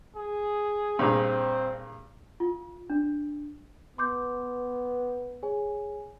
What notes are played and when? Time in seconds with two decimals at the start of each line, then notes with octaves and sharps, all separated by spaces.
0.16 G#4
0.99 G2 A#2 C4 G#4
2.40 F4
2.90 D4
3.98 B3 C6 D6 G6
5.43 G#4 C#5 G#5